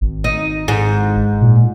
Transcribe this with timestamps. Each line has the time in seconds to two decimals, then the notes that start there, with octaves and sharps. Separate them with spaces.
0.01 G#1
0.24 D#4
0.68 G#2
1.41 A#2